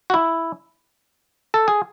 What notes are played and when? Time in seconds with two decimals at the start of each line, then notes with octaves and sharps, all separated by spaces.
0.10 F#4
0.14 E4
1.54 A4
1.68 G#4